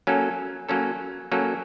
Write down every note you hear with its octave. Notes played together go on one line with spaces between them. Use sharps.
F#3 A#3 C#4 A4
F#3 A#3 C#4 A4
F#3 A#3 C#4 A4